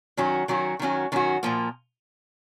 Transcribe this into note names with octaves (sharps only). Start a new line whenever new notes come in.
D#3 F#3 C#4 F#4
D#3 F#3 C#4 F#4
D#3 F#3 C#4 F#4
D#3 F#3 C#4 F#4
A#2 F3 A#3